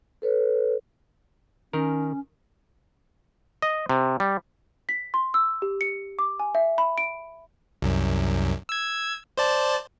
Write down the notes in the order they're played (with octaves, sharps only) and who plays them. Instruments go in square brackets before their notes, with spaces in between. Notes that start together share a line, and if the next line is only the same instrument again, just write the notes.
[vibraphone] A4 B4 C#5
[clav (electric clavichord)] D#3 A#4 [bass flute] C#4
[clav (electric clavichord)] D#5
C3
G3
[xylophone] B6
C6
E6
G4
C#7
D6
G#5
E5
B5
D7
[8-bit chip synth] C2 F#2
E6 G#6
C5 D5 A5